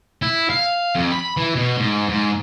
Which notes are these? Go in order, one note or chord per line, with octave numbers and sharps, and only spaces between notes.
E4
F5
F2
B5
E3
B2
G#2
G#2